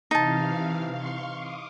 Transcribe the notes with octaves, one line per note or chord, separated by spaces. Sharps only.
C3 E3 D#4 F5 A5
F5 C6 C#6
D6 D#6